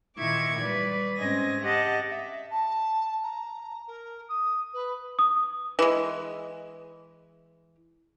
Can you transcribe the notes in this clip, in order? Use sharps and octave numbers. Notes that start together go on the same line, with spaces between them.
A#2 D#3 E4 C#6 D6 G#6
G3 B4 D5
G#2 C4 C#4 D#5 G#5 A#6
G4 D#5 F#5 A5
E5
A5
A#5
A#4
D#6
B4
D#6
E3 G#3